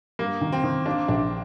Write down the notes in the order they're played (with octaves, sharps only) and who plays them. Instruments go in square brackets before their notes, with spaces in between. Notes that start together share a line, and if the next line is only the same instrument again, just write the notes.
[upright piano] G2 [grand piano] A#3
[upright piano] D#3
[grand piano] C4
[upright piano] D#3
[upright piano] A#3 [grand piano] D4
[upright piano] A#1 [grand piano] D4